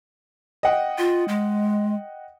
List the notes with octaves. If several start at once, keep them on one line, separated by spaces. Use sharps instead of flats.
D#5 F#5 G5
F4
G#3